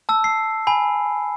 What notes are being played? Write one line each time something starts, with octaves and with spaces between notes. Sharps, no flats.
A5 E6
C7
G#5 B5